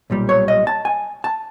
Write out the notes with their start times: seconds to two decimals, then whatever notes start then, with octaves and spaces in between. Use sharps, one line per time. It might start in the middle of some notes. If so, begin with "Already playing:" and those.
0.10 B1 A#2 G3
0.29 C#5
0.48 D#5
0.67 A5
0.85 G#5
1.24 A5